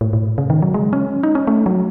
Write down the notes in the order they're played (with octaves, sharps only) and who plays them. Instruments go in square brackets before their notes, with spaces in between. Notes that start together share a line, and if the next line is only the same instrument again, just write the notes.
[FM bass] A2
A2
C#3
D#3
F#3
G#3
C#4
D#4
C#4
A3
F#3